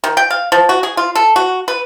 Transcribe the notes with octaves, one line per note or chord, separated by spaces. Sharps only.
D#3
G5
F5
F3
F#4
G#4
F4
A4
F#4
B4